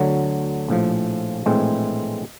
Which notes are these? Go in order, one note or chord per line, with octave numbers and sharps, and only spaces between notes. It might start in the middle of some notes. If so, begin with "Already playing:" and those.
Already playing: D2 D3 F#3
A#1 A2 F3
A#1 A2 E3 G#3 C4